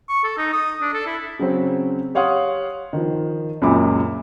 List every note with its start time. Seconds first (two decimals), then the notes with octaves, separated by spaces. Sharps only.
0.09 C#6
0.24 A4
0.38 D#4
0.53 D#6
0.81 D4
0.94 A4
1.06 E4
1.39 C#3 F#3 C4
2.15 G4 C#5 F5 F#5 C6 D#6
2.93 D#3 F3
3.62 C#2 F#2 A#2 B5 D6